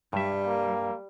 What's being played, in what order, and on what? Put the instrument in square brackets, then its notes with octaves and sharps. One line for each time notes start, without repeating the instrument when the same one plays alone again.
[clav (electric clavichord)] G2 E5 [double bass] G3
[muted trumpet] A#3